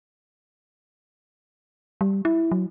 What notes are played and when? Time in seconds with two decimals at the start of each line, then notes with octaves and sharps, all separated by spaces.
2.01 G3
2.25 E4
2.51 F#3